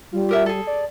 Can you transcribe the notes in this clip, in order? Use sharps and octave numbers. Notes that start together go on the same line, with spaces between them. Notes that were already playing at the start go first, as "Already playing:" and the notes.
G3 F4
G4 A#4 E5
G#4 A4
D5